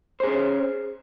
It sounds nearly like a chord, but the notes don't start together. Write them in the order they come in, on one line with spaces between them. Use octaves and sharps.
C5 G#4 C#4